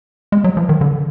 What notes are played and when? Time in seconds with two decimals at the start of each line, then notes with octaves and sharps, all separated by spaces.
0.32 G#3
0.44 F#3
0.57 F3
0.69 D#3
0.81 D3